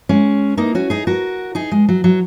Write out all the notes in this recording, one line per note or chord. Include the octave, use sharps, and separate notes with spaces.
G#3 C#4
A#3 D#4
C#4 F#4
D#4 G#4
F#4 A#4
D#4 G#4
G#3
F#3
F#3